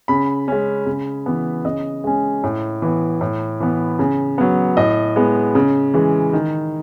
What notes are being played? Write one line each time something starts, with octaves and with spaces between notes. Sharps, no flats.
C#3 B5
G#3 C#4
C#3
E3 B3
C#3 D#5
G#3 C#4
A2
E3 B3
A2
E3 B3
C#3
F#3 B3
A2 D#5
G#3 B3
C#3
E3 G#3
D#3